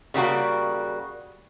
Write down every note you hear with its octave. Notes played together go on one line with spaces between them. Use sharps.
C#3 G3 A#3 F#4